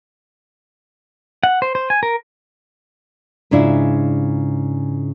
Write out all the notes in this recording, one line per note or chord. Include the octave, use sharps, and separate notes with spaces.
F#5
C5
C5
G#5
A#4
G#2 C#3 D4 E4 F4